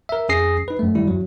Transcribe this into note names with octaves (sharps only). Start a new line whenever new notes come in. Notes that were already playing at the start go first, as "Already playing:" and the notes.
A#4 E5
F2 C#4 G#4 D#6 A#6 C7
D#4 B4
F#2 A3
D#3 G3 E4
F#2 F#3